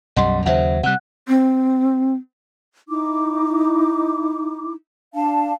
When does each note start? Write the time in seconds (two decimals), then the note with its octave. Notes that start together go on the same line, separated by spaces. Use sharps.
0.16 B1 F#2 G3 D#5 F#5 C6
0.46 D#2 C#3 F#3 C5 E5 F#5
0.83 C3 G3 F#5 F#6
1.28 C4
2.89 D#4 E4 D6
5.14 D4 F5 A5